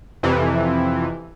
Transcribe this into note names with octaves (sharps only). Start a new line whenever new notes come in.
F2 C3 E3